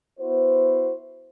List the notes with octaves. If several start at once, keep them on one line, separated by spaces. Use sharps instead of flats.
B3 E4 F#4 C5